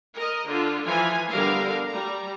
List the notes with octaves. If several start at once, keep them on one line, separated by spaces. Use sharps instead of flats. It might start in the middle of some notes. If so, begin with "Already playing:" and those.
A#4 D#5
D3 F4
E3 F3 F4 G#5
D3 G3 B3 A#4 F5
G3 A#5